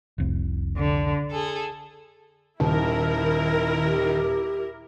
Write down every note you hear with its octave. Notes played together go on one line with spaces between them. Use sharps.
F1 C2
D3
G#4 A4
D#1 D#3 E4 A#4
G4